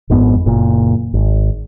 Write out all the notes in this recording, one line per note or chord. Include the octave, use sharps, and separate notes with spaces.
G#1 F2 G#2 B3
F#1 A#2
G#1